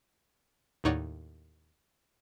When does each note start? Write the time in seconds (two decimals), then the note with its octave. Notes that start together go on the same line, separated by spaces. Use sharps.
0.84 D#2 A2 D#4 C#5 D5 F#5